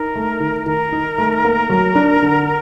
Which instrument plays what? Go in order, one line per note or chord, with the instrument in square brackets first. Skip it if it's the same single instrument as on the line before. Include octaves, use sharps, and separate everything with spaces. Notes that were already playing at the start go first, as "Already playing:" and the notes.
Already playing: [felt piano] D#4 [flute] A#4
[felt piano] A3
D#3
[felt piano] D#3 [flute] A#4
[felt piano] D#4
A3
A#3
F#3
D4
D3